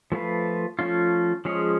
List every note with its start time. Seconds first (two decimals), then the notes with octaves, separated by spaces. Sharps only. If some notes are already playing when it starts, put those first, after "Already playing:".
0.12 F3 A3 F4 B4
0.79 F3 A3 C#4 F4
1.45 F3 G#3 C#4 G#4 C#5